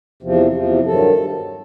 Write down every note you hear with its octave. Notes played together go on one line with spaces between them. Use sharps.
E2 C3 F3
E2 C3 F3
G2 D#3 F#3 A4